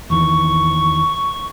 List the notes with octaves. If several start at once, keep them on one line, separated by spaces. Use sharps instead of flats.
E2 D#3 E3 C#6